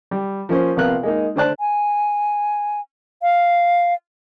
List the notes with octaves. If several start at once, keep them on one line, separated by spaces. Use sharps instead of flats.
G3
F3 A#3 C#4 C5
A#1 C3 B3 A#4 F5 F#6
G#3 A#3 D#4
D3 A3 C5 D5 A5 F#6
G#5
F5